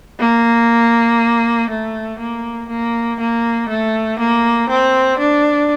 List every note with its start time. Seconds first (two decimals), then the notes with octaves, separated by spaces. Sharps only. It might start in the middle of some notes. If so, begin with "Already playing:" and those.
0.19 A#3
1.70 A3
2.19 A#3
2.70 A#3
3.20 A#3
3.69 A3
4.19 A#3
4.69 C4
5.19 D4